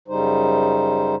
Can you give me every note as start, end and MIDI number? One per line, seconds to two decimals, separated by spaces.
0.08 1.15 42
0.08 1.15 49
0.08 1.15 55
0.08 1.15 63
0.08 1.15 72